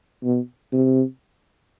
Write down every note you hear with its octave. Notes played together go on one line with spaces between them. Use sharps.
B2
C3